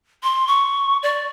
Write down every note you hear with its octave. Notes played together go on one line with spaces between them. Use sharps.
C6
C#6
D5